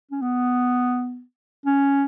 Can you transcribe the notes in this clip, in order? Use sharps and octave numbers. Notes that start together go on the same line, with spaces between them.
C#4
B3
C#4